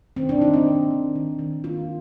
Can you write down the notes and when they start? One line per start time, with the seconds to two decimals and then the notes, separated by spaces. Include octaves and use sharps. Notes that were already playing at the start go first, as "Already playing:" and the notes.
0.16 D#3 C4
0.29 D4
0.41 D#3 D#4
0.54 C4
0.66 A#3
0.91 D#3
1.16 D#3
1.39 D#3
1.64 A#3 F4